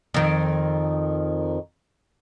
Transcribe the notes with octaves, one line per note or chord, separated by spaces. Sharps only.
F2 D#3